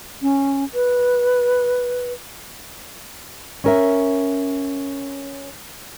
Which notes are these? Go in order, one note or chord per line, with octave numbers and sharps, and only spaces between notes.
C#4
B4
C#4 A#4 E5